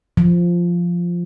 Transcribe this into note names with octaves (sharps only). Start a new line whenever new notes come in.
F3